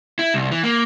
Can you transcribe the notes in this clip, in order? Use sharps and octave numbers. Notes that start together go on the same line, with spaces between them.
E4
C2
E3
A#3